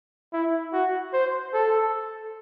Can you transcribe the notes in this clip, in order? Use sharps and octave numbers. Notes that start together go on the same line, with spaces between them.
E4
F#4
C5
A4